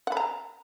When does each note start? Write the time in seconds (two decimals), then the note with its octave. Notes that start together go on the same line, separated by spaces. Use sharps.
0.07 F#5
0.12 B5
0.17 A#5